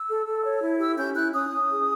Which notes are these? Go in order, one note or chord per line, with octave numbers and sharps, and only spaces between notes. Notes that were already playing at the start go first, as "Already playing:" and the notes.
Already playing: E6
A4
A4
C#5
E4
G4 E6
C#4 G6
E4 F#6
C#4 D#6
C#4
G#4